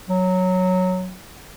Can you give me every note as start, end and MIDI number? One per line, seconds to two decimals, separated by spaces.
0.09 1.15 54